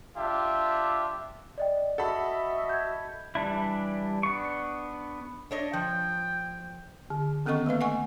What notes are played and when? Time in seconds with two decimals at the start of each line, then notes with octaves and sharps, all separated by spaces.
0.16 D4 F4 G4 E5
1.58 D5 D#5 G5
1.98 F#4 A4 D#5 E5 F#5 B5
2.69 G6 G#6
3.35 E3 G3 D4 E4
4.23 B3 D4 C#6
5.51 D4 C#5 D#5
5.73 F3 G5
7.10 D3
7.46 D#3 B3 C#4 A4 D#5 C#6
7.66 A3 A#3 B4 F5
7.81 F#5 G#5 C#6